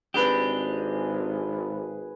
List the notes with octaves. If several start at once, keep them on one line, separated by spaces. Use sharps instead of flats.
G#1 C4 D4 G4 G#4 B4